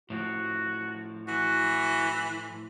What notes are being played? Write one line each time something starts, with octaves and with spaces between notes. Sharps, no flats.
A2 F3 F#4
E3 F#4